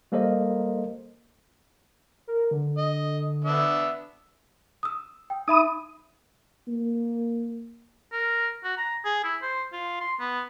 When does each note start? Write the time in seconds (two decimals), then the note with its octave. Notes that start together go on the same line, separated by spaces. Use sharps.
0.12 G3 A#3 A4 A#4 C5 D#5
2.28 A#4
2.51 D3
2.78 D#5
3.45 B3 D4 E5
4.83 D#6 E6
5.30 G5
5.48 D#4 E5 B5 D#6
6.68 A#3
8.12 A#4
8.64 F#4
8.78 A#5
9.05 G#4
9.24 E4
9.42 C5
9.73 F4
10.01 C6
10.20 B3